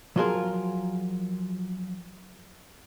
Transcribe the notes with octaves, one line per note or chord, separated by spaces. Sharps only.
F3 F#3 F4 F#4 G#4 A#4